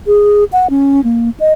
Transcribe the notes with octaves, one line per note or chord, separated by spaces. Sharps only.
G#4
F#5
C#4
A#3
D#5